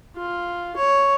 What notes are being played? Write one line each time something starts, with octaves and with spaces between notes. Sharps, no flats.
F4
C#5